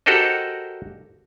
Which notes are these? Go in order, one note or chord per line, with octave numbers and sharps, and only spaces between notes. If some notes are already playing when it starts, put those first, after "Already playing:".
F#4 G4 A4 A#4 C5 D#5